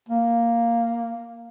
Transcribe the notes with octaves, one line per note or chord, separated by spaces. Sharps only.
A#3